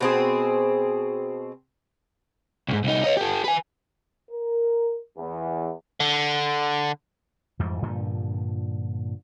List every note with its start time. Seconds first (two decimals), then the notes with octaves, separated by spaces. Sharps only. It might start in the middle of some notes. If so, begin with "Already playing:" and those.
0.01 B2 C4 G#4
2.68 C2 G#2
2.84 C2 D#4
3.04 C#5 D#5
3.17 G4 A4
3.44 B4 G#5
4.30 A#4
5.18 E2
6.00 D3
7.59 F2 G#2 E3 G3
7.82 G2 A#2 D3 F3